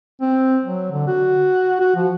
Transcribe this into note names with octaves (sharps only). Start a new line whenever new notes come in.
C4
F#3
D3
F#4
F#4
F3